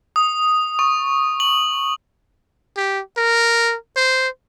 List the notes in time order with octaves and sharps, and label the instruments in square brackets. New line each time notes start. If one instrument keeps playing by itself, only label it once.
[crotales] D#6
C#6
F#7
[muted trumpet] G4
A#4
C5